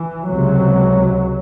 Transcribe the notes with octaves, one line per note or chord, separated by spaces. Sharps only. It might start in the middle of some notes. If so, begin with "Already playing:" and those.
Already playing: E3
C#2 C3 F#3